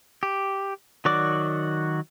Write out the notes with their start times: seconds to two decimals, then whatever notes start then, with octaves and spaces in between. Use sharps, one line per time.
0.23 G4
1.05 D#3 F#3 F#4 D5 D6